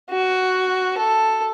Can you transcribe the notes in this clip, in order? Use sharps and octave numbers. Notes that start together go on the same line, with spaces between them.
F#4
A4